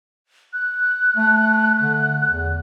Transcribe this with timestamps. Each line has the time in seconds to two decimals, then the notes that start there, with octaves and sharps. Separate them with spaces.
0.53 F#6
1.17 A3
1.81 D3
2.28 E2